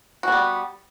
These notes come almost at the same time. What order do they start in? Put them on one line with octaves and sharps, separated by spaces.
F#4 B3 G3